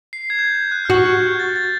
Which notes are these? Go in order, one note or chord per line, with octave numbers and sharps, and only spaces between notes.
C7
G#6
G6
G6
F#6
F6
F#4 F#6
G6
G#6
A6
A6